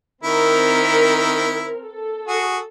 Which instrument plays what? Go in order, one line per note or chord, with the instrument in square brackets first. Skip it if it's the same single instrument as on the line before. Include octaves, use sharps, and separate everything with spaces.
[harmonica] D#3 E4 [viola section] C4 A#4
[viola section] A4
[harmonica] F#4 G#4